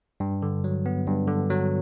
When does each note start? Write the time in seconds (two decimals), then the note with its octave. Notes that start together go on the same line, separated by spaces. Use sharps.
0.20 G2
0.42 D3
0.64 F#3
0.86 B3
1.07 G2
1.28 D3
1.50 F#3